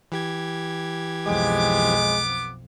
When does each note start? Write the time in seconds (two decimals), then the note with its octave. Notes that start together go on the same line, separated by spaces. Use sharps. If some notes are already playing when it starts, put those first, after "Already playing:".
0.12 E3 G4 G#6
1.27 B1 F2 G#3 B3 D6